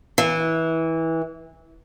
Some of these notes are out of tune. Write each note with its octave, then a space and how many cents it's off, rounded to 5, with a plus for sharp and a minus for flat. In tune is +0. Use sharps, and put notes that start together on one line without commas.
E3 -20